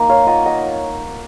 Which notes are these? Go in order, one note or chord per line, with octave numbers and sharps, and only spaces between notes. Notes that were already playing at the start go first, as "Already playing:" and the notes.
Already playing: A#3 D#4 A#4 D#5
C#5 F5
F4 D#5 F#5
D#5 F#5